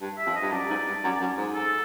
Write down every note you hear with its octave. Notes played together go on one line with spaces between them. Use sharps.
G2
E5
F2
D#5
G2
F#2 D5
G#2
G2
F#2
F#2
G#2
A4